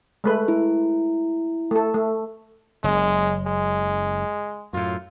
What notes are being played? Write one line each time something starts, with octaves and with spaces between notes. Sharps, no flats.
G#3 A3 B4
E4
A3 A4
A3
F#1 G#3
G#3
F#2 A2 F4